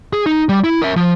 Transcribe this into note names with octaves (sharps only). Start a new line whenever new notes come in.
G#4
D#4
G3
E4
A#4 E5
F3